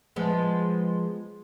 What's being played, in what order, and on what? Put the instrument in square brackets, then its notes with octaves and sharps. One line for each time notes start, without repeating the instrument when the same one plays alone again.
[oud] F3 G#3 B3